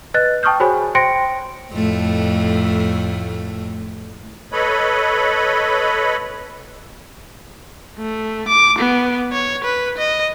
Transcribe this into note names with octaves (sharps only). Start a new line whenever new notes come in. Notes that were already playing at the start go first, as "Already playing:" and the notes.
B4 D#5 F#6 A6
G5 A5 C#6 D#6 F6 G6
F#4 G#4 C5 C#5 G#5 B5
C5 G5 C6 A#6 C#7 D7
F2 A2 A3
A4 B4 C#5 D#5 B5
A3
D6
B3
C#5
B4
D#5